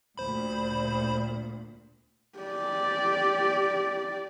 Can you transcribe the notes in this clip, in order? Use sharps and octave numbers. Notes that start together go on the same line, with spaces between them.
D2 A#2 C5 B5
G4 D5